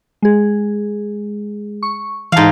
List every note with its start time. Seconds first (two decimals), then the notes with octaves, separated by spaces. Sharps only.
0.22 G#3 G#4
1.83 C#6
2.32 G#2 E3 F5 A5